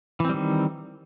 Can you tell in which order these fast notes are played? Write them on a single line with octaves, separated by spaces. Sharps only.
E3 C4 G3 D#3